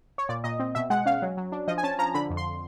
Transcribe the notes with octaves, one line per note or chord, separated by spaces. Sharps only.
C#5
A#2 D5
A#2 D#5
C4
B2 E5
G#3 F#5
C#4 F5
F#3
F#3
D4
F3 D#5
G#5
C#4 A5
F3 A#5
D3 B5
F2
C6